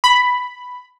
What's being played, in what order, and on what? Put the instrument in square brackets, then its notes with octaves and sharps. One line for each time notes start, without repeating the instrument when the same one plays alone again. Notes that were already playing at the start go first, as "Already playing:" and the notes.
[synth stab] B5